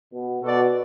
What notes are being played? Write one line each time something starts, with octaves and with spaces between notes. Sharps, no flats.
B2
B2 F#4 A4 D5